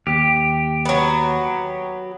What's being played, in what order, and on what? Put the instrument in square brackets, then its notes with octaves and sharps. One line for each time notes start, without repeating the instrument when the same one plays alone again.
[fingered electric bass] D#2 [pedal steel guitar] G4
[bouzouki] F#3 B3